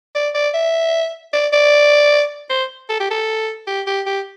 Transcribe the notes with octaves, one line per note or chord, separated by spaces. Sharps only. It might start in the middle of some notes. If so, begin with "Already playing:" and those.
D5
D5
E5
D5
D5
C5
A4
G4
A4
G4
G4
G4